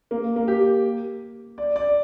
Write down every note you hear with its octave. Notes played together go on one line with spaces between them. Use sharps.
A#3
A#3
G4
D5
D5